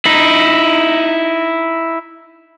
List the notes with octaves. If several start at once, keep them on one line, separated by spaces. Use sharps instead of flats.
D#4 E4